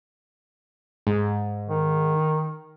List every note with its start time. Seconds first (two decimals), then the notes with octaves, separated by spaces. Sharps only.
1.07 G#2
1.69 D#3